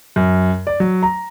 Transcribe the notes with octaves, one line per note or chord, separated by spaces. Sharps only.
F#2
D5
F#3
A#5